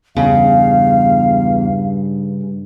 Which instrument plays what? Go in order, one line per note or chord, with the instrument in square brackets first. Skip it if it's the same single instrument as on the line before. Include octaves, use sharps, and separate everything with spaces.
[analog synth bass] E2 [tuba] G2 [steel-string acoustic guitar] C#3 [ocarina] F5